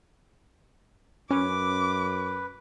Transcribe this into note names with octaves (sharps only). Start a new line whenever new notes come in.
F#2 C#4 B4 D6